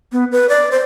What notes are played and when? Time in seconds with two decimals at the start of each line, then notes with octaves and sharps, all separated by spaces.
0.12 B3
0.32 B4
0.49 D5
0.72 C5